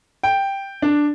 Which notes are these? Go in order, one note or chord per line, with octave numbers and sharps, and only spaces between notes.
G5
D4